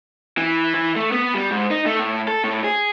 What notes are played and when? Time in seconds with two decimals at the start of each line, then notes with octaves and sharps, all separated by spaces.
0.38 E3
0.74 E3
0.96 A3
1.12 B3
1.34 G3
1.51 G#2
1.71 D#4
1.86 A3
1.99 A2
2.28 A4
2.44 A2
2.64 G#4